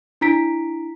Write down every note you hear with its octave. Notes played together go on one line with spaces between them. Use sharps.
D4 E4 A#5 B6 D7